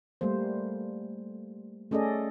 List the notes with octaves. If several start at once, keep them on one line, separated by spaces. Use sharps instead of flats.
G3 A3 A#3 C5
A3 C#4 G#4 A4 D5 D#5